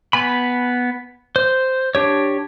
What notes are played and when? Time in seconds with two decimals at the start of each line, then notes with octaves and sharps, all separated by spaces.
0.13 B3 G#5 B5
1.36 C5
1.95 D4 G4 C#5